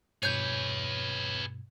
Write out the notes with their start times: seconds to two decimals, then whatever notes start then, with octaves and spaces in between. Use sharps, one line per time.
0.23 G2 B2 G#4 B4 C#5 G6